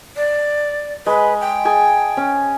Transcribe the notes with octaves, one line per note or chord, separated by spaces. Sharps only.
D5
G#3 B4
G5
G#4 G#5 A5
C#4